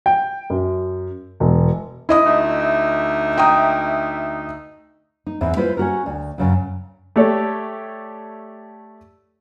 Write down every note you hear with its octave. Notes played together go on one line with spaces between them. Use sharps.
G5
F#2
E1
E4 D#5 D#6
D2 D#4 E5
G5 A#5 D#6
D#4
E2 G#2 E3 C4
E4 F4 B4 C5
C#4 F#4 A#4
D2
F#2 C#3 F#3
A3 G4 A4 C#5 D5